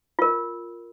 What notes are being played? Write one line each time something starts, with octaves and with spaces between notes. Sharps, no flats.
F4 A#4